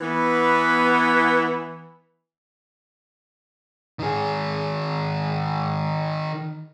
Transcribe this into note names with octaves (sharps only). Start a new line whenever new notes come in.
E3 B3
D#3 G#4